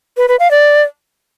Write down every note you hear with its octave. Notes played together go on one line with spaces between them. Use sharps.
B4
B4
F5
D5